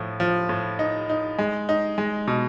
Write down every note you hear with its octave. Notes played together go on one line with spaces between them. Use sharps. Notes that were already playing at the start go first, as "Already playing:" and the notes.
Already playing: A2 F3
F3
A2
D#4
D#4
G#3
D#4
G#3
B2